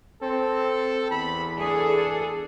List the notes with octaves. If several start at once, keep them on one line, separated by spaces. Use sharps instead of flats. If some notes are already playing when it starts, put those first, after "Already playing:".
C4 A4
E2 B5
D4 G#4 A4